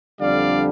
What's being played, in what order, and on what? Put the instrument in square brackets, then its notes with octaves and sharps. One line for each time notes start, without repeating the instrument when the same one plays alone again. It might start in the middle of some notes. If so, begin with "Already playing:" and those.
[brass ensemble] F2 D3 G3 D4 D5 F5